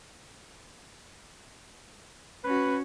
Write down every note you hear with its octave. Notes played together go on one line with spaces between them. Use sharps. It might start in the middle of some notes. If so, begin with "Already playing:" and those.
C#4 F#4 B4